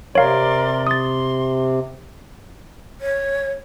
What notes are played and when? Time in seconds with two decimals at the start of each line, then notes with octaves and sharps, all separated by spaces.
0.15 C3 A#4 C#5 D5 F5 C6
0.87 C6 D#6 A6
3.01 C#5